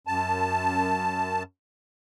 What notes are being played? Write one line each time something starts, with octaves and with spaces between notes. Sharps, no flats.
F#2 A5